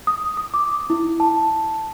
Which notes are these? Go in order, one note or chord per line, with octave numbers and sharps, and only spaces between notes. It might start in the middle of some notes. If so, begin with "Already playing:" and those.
D#6
D#6
D6
E4
A5